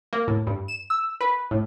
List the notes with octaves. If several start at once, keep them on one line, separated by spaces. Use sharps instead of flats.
A#3
A2
G2
E7
E6
B4
A2